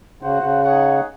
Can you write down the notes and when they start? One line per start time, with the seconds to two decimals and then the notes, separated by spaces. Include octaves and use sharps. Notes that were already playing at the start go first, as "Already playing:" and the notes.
0.22 C#3 F#4 C5 F#5
0.43 C#3
0.64 D#4 G#4 C#5 F#5